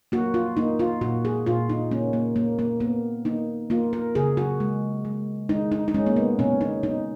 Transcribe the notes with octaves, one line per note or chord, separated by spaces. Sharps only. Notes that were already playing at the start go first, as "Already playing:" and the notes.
A#3 F#4
F4
A#3 D#4
F4
A#2 F#4
G#4
A#2 F4
D#4
A#3 C#4
A#3
A#3
A#3
A#3 B3
A#3 D#4
A#3 F4
A#4
C#3 G#4
F#4
G#3
G#3
G#3 D#4
D#4
D#4
G#3 C#4
A#3
B3
B2 C#4
D#4
B2 D#4